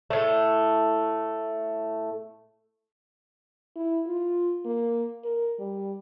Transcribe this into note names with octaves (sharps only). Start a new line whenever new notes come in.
A2 A3
E4
F4
A#3
A#4
G3